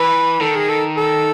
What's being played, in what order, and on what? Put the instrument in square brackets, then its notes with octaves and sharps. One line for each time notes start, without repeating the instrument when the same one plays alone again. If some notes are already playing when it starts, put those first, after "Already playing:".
Already playing: [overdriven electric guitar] E3 [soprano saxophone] B4
[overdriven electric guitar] D#3 [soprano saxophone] A4
[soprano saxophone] G#4
A4
A4